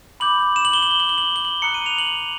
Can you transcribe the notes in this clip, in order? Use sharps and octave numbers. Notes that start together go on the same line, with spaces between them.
B5 D6 G6 F#7
E7
F#7
G7
F#7
G7
F#7
G7
F#7
G7
F#7
A#5 D#6 F#6 C#7
D#7
F7
F#7